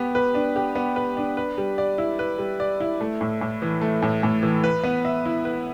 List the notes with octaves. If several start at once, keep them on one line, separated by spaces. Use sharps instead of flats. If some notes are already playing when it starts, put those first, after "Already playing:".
Already playing: B3 G4
B4
D4
G4
B3
B4
D4
B4
G3
D5
E4
B4
G3
D5
E4
A3
A2
A2
E3
A3
A2
A2
E3
B4
B3
E5
E4
B4